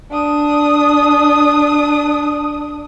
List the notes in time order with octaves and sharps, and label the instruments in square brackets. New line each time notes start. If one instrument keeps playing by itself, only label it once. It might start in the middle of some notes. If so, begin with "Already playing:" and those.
[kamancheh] D4 D#6